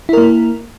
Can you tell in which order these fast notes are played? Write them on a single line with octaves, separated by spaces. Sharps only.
E4 A#4 A#3